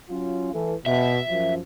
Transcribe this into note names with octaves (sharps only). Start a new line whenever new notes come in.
F#3 C#4 F4
E3 A3
B2 E5
F#2 F3